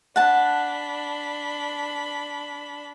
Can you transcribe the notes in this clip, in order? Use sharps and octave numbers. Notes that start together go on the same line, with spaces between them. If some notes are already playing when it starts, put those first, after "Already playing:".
D4 F#5 A5 B5